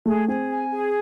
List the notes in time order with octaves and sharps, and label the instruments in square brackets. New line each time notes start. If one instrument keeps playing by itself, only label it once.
[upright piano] A3 [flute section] G#4
[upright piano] C4 [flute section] G#4
[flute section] G#5
G#4